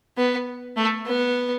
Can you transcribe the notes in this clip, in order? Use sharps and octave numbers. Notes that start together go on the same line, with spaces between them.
B3
A3
B3